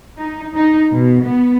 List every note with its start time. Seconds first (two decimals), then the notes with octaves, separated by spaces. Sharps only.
0.17 D#4
0.54 D#4
0.91 B2
1.23 B3